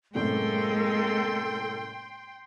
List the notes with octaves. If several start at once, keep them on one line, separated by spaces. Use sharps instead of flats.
F#2 A2 C3 G#3 A#3 A4 G5 C6